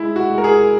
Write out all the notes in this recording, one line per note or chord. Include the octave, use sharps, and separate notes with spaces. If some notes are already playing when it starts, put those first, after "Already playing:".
Already playing: G#3 E4
F#4
G#3
A#4
G#4